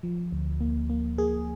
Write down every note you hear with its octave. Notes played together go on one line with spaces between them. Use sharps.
F3
D2
A#3
A#3
A#3 G#4